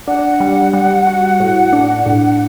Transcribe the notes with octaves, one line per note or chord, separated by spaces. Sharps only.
D4 F#5
G3
G3
F#4
A2
D4
A2